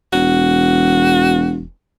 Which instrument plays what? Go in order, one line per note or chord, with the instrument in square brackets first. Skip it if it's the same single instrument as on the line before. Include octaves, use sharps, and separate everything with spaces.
[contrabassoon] E1 [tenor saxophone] F#4